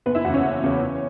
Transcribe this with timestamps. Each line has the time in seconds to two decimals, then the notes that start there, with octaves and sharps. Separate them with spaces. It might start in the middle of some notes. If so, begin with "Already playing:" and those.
0.06 F#1 B3 B4
0.15 E4 E5
0.24 E2 F#4 F#5
0.30 C#3 C#4 C#5
0.44 F#1
0.64 E2 C#3
0.82 E2